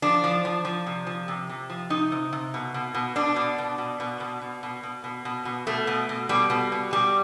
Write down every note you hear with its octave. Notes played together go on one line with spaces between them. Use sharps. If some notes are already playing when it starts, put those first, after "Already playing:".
F3 D4
F3
F3
F3
C3
F3
C3
C3
F3
C3 D#4
C3
C3
B2
B2
B2
B2 D4
B2
B2
B2
B2
B2
B2
B2
B2
B2
B2
B2
B2 A3
B2
B2
B2 G3
B2
B2
B2 G3